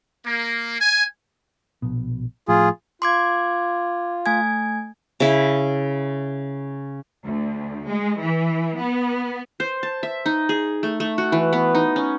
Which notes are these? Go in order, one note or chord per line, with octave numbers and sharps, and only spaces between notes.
A#3
G#5
A#1 B2
A2 F3 F4 G#4
F4 C6 D6 G#6
A3 G#5 G#6
C#3 E4
D2
G#3
E3
B3
C5
A5
E5
D#4
G#4
A3
A3
F#4
E3
B3
D#4
C#4